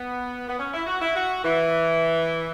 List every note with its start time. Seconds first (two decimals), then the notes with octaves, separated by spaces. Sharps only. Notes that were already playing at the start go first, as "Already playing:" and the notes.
Already playing: B3
0.48 B3
0.58 C#4
0.73 E4
0.86 F#4
1.01 E4
1.14 F#4
1.43 E3